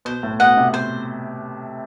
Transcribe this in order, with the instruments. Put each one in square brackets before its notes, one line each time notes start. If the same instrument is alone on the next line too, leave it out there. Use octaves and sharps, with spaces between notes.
[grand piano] B2 [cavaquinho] C5
[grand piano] A2
[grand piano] B2 [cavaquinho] D#5 F#5
[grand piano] C3
[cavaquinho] C5